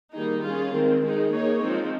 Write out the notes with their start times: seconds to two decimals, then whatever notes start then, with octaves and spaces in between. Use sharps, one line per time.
0.15 D#3 G3 A#3 D#4 G#4
0.44 C#4 F4 G#4
0.73 D#3 G#3 C4
1.03 D#3 G#3 D#4 G#4
1.32 A#3 D#4 G#4 C#5
1.61 F3 G#3 C4 D#4